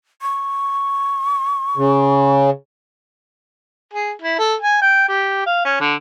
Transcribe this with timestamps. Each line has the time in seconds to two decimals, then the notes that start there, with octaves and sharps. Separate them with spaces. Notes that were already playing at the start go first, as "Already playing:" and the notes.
0.22 C#6
1.77 C#3
3.93 G#4
4.21 E4
4.39 A4
4.60 G#5
4.81 G5
5.09 G4
5.46 F5
5.65 C#4
5.80 D3